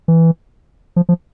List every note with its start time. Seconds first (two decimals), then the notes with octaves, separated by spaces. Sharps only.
0.08 E3
0.96 F3
1.09 F3